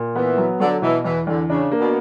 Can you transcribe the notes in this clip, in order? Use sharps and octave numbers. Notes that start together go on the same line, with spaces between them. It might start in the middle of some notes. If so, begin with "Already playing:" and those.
Already playing: A#2
E3 B3
F#3
D3 F#3
B2 E3
E2 E3
E2 D3
C#3 D4
A#3
B2